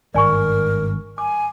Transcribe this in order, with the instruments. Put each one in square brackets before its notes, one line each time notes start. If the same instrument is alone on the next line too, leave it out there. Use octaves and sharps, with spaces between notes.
[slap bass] G#1 G2 [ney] A#4 [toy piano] D5 G#5 C#6
[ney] G#5 [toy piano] D6